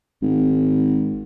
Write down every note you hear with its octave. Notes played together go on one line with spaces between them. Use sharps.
G#1